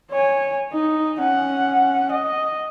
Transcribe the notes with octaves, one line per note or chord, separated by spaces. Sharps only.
C#5 G#5
D#4
C#4 F#5
D#5